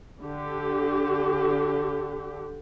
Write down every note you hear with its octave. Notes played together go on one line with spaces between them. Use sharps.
D3 G4